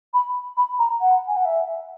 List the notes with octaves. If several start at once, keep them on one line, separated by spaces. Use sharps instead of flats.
B5
B5
A#5
F#5
G#5
F#5
E5